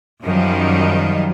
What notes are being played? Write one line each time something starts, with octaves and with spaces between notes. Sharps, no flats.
F#2 D#3 F3 G3